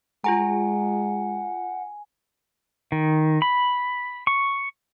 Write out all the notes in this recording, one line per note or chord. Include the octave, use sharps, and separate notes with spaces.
G#3 F4 G#4 F#5 G#5 A#5
D#3
B5
C#6